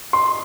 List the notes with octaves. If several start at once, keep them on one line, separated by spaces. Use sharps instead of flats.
C6